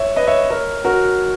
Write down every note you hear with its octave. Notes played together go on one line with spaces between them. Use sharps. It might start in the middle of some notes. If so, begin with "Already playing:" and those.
Already playing: C#5 E5
B4 D#5
C#5 E5
A#4 C#5
F#4 A#4